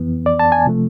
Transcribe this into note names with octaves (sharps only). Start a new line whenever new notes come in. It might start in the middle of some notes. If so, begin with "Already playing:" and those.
Already playing: F2 E3 B3
D5
A5
G#5
C3 F3 A3